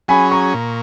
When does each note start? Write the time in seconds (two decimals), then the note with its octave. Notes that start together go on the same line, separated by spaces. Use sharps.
0.08 F#3 C#4 G#4 G#5 B5
0.31 A#5 C#6
0.54 A#2